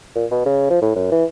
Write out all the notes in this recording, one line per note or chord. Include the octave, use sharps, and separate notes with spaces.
A#2
B2
C#3
F3
A2
F#2
E3